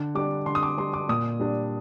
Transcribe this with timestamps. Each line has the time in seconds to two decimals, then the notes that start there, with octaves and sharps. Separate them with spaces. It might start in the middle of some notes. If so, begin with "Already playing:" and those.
Already playing: D3
0.15 G3 D4 D6
0.46 D3 C6
0.55 D#6
0.63 D6
0.78 G3 D4 C6
0.93 D6
1.09 A#2 D#6
1.40 G3 D4